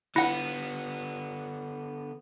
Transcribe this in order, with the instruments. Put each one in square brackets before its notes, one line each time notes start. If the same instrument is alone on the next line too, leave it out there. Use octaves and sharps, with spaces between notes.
[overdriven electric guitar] D3 B3 [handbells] E4 F#5